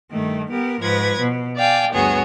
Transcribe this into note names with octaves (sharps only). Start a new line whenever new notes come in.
G2 D#3 A3
B3 G4 A#4
G#2 F3 B4 G#6 A#6
B2
D5 F5 G5 G#5
D2 G2 B3 F#4 G#4 C#5